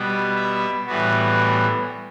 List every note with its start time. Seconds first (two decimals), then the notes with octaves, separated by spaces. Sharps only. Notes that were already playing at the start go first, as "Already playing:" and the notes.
Already playing: B2 G3 B3
0.35 E5
0.86 A2 E3 G3 B3 F#4